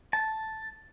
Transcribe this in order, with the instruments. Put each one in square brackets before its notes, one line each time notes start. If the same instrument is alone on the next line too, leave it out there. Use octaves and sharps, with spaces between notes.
[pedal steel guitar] A5